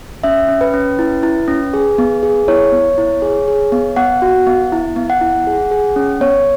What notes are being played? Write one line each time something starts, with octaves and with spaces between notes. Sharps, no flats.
C#4 E5
C#4
B4
C#4
E4
E4
C#4
G#4
B3
G#4
E4 C#5
B3
E4
G#4
G#4
B3
B3 F#5
F#4
B3
E4
B3
F#5
E4
G#4
G#4
C#4
B3 C#5